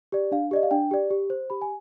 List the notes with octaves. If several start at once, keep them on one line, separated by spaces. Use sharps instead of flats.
G4 D5
D4 F5
G4 D5 D#5
F5
D4 G5
G4 D5
G4
C5
G4 B5
G#5